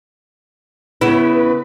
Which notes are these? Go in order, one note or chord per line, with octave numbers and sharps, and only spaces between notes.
C#3 B3 E4 B4